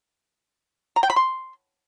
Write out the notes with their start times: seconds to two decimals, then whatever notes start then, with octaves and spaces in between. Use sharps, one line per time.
0.96 A#5
1.03 G5
1.10 B5
1.16 C6